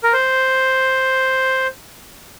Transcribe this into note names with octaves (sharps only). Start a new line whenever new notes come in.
A#4
C5